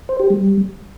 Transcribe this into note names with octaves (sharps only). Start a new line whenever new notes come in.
C5
G4
G3